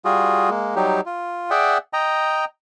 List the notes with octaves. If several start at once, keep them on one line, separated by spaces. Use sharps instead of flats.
G3 F4 F#4 G#4
G#3 A#3
F#3 G3 D#4 G4
F4
G#4 D5 E5 F#5 G5
D#5 G5 A#5